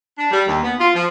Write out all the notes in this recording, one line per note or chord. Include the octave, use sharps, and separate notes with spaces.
D4
G3
D#2
B3
F4
F3